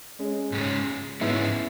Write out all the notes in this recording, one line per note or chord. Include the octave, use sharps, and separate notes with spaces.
G#3 C#4
G#2 G#3 C#4
G#2 G#3 B3 C#4 E4